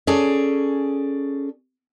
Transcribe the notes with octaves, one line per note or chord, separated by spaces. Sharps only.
C#4 G#4 A4 D5